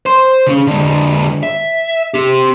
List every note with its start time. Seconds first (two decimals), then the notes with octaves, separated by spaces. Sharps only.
0.06 C5 C6
0.47 C#3 C#4
0.67 D3 G#3
1.43 E5
2.14 C4 G4